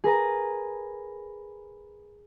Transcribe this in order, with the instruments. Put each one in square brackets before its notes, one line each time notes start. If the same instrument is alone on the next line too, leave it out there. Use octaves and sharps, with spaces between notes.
[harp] G#4 A#4 B4 A#5